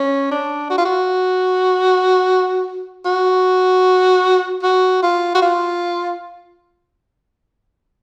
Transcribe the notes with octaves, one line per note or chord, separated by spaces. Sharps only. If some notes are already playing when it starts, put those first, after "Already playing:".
Already playing: C#4
D4
F#4
F4
F#4
F#4
F#4
F4
F#4
F4